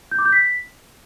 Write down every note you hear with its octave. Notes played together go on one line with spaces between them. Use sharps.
G6
D6
G6
B6